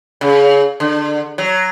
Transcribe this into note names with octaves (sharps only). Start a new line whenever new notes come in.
C#3
D3
F#3